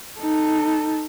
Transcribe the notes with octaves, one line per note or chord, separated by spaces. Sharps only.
D#4 A4